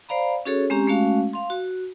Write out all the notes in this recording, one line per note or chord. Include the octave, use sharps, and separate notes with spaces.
C5 D5 F5 A#5 B5
C#4 F#4 G#4 A4 C#5
G#3 C4 C#4 G4 A#5
G#3 A3 C#4 F#4 F5
F5 C6
F#4